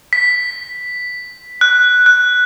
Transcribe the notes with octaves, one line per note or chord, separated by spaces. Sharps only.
B6
F#6
F#6